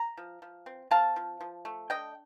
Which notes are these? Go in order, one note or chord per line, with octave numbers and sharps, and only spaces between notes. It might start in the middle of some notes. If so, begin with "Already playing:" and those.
Already playing: A#5
F3
F3
C4
C4 F5 A5
F3
F3
A3
D4 D#5 G5